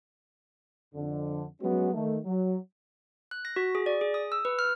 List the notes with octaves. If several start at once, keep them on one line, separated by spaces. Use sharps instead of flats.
F2 D3
F#3 G#3 B3 C#4 F#4
D#3 A3
F#3
F#6
A#6
F#4
G#4
D5
G#4
D#6
E6
B4
F6